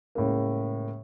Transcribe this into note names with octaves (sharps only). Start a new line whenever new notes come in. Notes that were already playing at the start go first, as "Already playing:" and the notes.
A2 C#3 G#3 A#3